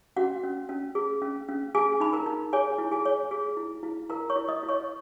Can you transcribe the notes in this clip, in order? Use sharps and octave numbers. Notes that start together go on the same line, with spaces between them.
C#4 F#4 F#5
C#4
C#4
G#4
C#4
C#4
G#4 G#5
D#4 B5
A#4 A#5
D#4
G#4 C#5 G#5
E4
G#4 G#5
C#5
G#4
E4
E4
E4 A#4 A#5
C#5 C#6
E4
D#5 D#6
E4
C#5 C#6